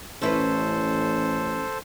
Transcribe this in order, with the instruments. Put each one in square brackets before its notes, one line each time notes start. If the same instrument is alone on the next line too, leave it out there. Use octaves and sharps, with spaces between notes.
[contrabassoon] A1 [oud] C#4 E4 B4 [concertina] A4 C5